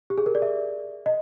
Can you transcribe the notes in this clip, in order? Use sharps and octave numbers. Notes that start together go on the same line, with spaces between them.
G4
G#4
A#4
D5
E5
D#5